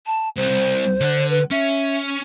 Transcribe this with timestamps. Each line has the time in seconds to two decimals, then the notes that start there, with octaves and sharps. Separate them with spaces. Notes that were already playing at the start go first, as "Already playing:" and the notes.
0.06 A5
0.36 C2 C5
1.01 D3 F#5
1.30 B4
1.51 C#4 E5